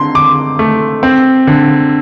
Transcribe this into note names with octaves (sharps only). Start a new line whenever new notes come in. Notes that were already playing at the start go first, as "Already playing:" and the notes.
Already playing: D3 C4 C6
D3 D6
A3
C4
D3